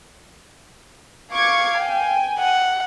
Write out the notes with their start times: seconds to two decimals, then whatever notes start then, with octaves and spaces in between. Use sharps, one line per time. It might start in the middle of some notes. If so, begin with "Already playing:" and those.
1.33 F5 C#6 D6 G#6
1.79 G5 G#5
2.39 F#5